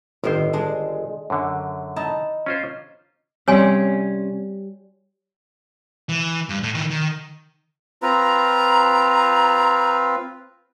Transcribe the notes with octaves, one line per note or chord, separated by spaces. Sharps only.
G1 A2 D#3 C5
G#3 D4
F#2 D3
D#4 E4 A5
C#4 F4 C5
C3 G3 C#4 C#5 G#5 C6
E3
G2
A2
D#3 E3
D#3
C4 F4 B4 A#5